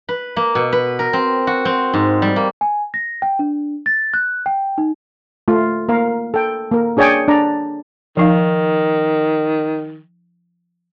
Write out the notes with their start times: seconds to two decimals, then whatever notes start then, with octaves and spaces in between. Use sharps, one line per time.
0.09 B4
0.36 A#3
0.55 B2
0.72 B4
0.99 A#4
1.13 C4
1.47 F#4
1.65 C4
1.94 G#2
2.22 G3
2.36 A#3
2.61 G#5
2.94 A#6
3.22 G5
3.39 D4
3.86 A6
4.14 F#6
4.46 G5
4.78 D#4
5.48 A3 F4
5.89 A#3 A#4 F5
6.34 A4 G5
6.71 A#3 A#4
6.97 D4 G#4 C#5 D5 G5 G#5
7.28 D4 D5 A#5
8.17 D#3 F3 D#4 F5